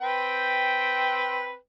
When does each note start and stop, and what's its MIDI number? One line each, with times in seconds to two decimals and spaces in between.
0.02 1.56 60
0.02 1.56 71
0.02 1.56 79